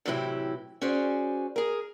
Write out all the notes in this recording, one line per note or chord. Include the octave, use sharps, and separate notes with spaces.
A2 C3 E3 F#3 E4 G4
C#4 F#4 G#4 C5 D5
G#4 A#4